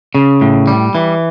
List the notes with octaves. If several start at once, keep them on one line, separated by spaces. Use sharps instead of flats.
C#3
A2
G3
E3